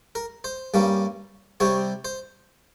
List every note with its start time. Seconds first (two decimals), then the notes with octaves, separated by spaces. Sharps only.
0.15 A#4
0.44 C5
0.74 G2 G3 A#3 C#4
1.60 C3 G3 C4 C#5
2.05 C5